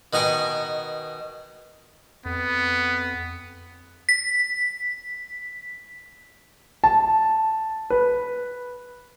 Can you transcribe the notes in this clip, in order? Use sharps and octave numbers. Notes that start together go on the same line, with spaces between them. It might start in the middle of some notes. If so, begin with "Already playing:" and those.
B2 D#3 G#5 A#5 C#6
F2 B3
B6
A5
B4